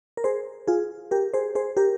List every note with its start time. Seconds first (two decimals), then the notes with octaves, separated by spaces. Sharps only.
0.17 A#4
0.24 G#4 C5
0.68 F4 G#4
1.11 G4 A#4
1.34 G#4 C5
1.55 G#4 C5
1.77 G4 A#4